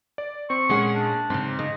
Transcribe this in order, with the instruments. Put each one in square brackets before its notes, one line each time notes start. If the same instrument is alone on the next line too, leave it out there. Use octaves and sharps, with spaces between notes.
[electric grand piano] D5
[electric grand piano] C4 [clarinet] C#6
[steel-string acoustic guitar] A#2 G#4 F#5 [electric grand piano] G#3 C#4
[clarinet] D4
[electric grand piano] G#2 [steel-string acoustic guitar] C#3 C4
[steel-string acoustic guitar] C#3 [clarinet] D#5